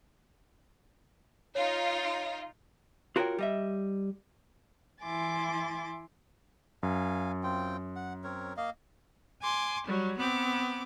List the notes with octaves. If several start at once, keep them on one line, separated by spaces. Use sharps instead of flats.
D#4 F4 C#5
F4 F#4 A#4 B4 C#5 G5
G3 D#5 E5
E3 E4 G#5 C6 D6 A6
F#2 F5 G#5
C4 F4 G5
F#5
C4 A#4 C#5
A#3 D#5 F5
G#5 C6 D6
F#3 G3
B3 C4 D6